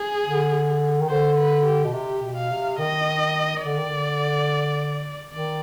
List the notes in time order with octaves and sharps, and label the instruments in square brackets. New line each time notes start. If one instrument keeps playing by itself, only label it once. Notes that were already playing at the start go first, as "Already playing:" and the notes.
Already playing: [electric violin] G#4
[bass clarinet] D3
D#3
[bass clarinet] D3 [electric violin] C5
[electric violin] B4
G4
[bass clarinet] B2
[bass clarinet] C3 [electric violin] G4
[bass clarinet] B2
[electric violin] F5
[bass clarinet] C3
[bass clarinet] D#3 [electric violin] D#5
[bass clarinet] D3 [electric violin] D5
[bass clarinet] D#3
D3
[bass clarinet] D#3 [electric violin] D5